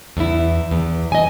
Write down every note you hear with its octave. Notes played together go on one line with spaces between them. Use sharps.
E2 E4
E2
D#5 G#5